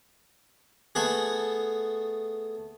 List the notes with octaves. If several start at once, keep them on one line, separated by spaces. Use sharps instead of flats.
A3 B3 G#4